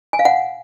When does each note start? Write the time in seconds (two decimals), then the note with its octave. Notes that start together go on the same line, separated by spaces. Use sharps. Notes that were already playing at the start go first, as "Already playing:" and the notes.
0.13 G#5
0.19 F5
0.25 F#5